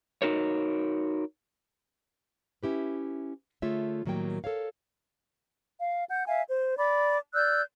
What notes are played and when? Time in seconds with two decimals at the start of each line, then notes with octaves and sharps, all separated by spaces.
0.22 D#4 F#4 A#4 C#5
2.63 C#4 E4 G4 B4
3.62 D3 A3 F4 G#4 C#5 E5
4.06 A2 D#3 F#3 G3 A#3 G5
4.44 A4 A#4 C#5 F5
5.80 F5
6.10 F#5 G6
6.27 E5 F5 G#5
6.49 C5
6.79 D5 B5 D6
7.34 D5 E6 F#6 G6